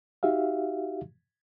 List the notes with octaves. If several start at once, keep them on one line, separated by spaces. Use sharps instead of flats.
D#4 F#4 G4 E5 F5